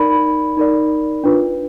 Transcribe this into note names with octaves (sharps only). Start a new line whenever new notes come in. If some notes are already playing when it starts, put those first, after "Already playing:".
Already playing: D#4 A#4 D5 B5
D#4 A#4 D5
D4 F4 B4